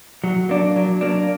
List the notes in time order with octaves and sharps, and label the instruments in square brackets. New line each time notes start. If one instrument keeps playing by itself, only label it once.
[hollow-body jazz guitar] F#3
A#3 D4
F#3
A#3 D4